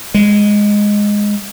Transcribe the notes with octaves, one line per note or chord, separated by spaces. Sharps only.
G#3